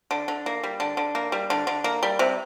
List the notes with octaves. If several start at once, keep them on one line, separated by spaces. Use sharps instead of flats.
D3
D3
A#3
G3
D3
D3
A#3
G3
D3
D3
A#3
G3
C3